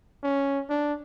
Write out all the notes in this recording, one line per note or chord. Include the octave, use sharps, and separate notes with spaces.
C#4
D4